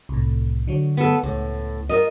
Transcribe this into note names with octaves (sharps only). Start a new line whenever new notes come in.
C2 A2
D3 F#3 C#5
B3 A4
C#2 A2
F4 A#4 D#5